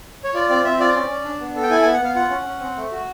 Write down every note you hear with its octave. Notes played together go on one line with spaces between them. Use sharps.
C#5
F4 D5
C4 D5
C4 E5
F4 D5
C#4
C#4
D4
B3
A4
G5
E4 G#5
G#5
B3
F#5
B3 F5
F4 F#5
C#4
C#4
C4
A3
F#4